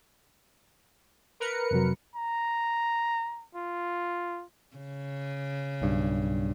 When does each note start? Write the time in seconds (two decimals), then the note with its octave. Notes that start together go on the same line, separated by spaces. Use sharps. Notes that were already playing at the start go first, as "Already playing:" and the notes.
1.40 A#4 B4 C#7
1.71 F2 C3 F#3
2.15 A#5
3.55 F4
4.76 C#3
5.82 B1 G2